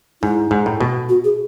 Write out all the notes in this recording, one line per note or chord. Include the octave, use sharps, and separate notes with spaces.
G#2 E4
G#2
A2
B2
F#4
G#4